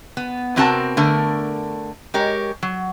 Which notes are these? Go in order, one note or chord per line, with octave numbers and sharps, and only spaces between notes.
B3
C3 B3 C4 F#4 A#4 A5
D3 A3 A#4
G#3 G4 A#4 C#5
F#3